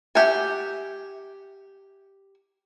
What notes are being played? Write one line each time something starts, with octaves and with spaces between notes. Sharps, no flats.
G4 E5 F#5 G#5